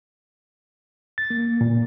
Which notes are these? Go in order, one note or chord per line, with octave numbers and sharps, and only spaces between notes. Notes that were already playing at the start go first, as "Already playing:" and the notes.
A6
A#3
A#2